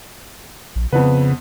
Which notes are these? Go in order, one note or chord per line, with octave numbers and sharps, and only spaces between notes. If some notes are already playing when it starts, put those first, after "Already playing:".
A#1
F2 C#3 B3 B4